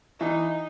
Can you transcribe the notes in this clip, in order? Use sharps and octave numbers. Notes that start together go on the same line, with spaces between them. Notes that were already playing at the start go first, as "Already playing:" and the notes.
E3 D#4